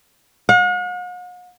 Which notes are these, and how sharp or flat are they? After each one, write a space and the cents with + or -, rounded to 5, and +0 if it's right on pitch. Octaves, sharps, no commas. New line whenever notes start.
F#5 -45